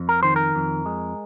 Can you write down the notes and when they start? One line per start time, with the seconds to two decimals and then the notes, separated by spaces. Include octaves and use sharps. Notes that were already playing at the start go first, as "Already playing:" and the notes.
Already playing: F2
0.09 A#4
0.23 D#3 C5
0.36 A#4
0.55 F2
0.86 G#3